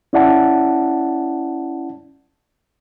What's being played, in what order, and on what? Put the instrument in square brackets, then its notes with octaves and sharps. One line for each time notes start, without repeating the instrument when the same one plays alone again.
[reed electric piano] C#4 E4 D5 F#5 A5